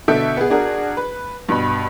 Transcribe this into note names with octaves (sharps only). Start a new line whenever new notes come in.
B2 D3 A4 E5 G6 D7
B3 G#4
D4 F#4 G#4 A#4
B4
G2 B2 B5